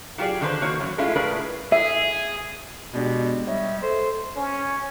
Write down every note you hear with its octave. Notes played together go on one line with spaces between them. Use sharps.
F#3 F4 G4 G#4 D5
D3 D#3 D4 G#4 B4 C5
D#3 A#3 F#4 C#5
F#2 F#3
G#3 A3 C#4 E4 F4
A2 A3 G#4 A#4 B4 D5
G#4 E5
B2 G#3 B3 D4 G4
G3 C#5 D#5 E5
A4 C5
C#4